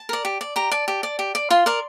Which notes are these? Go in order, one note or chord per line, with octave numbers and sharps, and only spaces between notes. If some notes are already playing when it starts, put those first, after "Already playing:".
Already playing: A5
A#4 D5
G4
D5
G4 A#5
D5 A5
G4
D5
G4
D5
F4 C6
A#4 D5